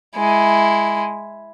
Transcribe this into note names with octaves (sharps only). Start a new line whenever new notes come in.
G#3 E4